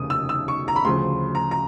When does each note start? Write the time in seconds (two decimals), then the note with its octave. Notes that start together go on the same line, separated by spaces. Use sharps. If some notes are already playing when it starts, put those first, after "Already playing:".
Already playing: F1 D#2 C#3 D#6
0.10 E6
0.29 E6
0.48 C#6
0.68 A#5
0.76 B5
0.85 D2 C#3 F3 C6
1.35 A#5
1.51 A#5